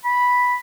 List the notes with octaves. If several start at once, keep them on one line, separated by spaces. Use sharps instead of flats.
B5